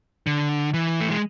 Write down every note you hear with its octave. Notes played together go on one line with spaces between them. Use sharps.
D3
E3
A3
G#3